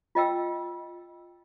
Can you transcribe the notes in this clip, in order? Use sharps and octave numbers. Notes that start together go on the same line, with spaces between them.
F4 D#5 G5 E6